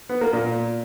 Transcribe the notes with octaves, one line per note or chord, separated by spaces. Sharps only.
B3
A#3
A#2